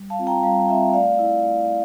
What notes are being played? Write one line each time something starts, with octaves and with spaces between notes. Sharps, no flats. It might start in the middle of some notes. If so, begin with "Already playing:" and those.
Already playing: G3
F5 A5
C4 F4
G5 A#5
G3 F5 A5
C4 F4 E5 G5
A3 D5 F5
E4
A3